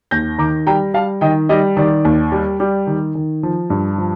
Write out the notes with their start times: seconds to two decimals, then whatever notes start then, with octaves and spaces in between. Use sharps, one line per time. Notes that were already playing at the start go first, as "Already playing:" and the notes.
0.11 D#2 G6 A#6
0.38 D#3 A#5 D6
0.67 G3 G5 A#5
0.94 G3 F5 A5
1.21 D#3 D#5 G5
1.49 G3 D#5
1.77 D#3 D5
2.05 D#2
2.32 G3
2.60 G3
2.87 D#3
3.15 D#3
3.43 F3
3.70 G2
3.98 F3